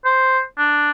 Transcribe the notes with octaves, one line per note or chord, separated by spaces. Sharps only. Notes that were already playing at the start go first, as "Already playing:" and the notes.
C5
D4